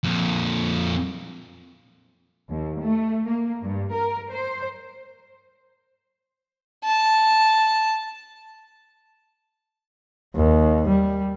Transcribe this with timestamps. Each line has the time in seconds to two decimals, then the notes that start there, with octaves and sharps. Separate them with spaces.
0.04 F2 A#2
2.49 D#2
2.80 A3
3.27 A#3
3.63 G2
3.93 A#4
4.31 C5
6.84 A5
10.36 D#2
10.88 G3